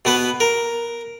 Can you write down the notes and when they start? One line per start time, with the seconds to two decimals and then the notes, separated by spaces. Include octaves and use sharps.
0.05 B2 B3 B4
0.40 A#4